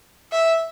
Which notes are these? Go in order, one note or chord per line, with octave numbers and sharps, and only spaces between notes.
E5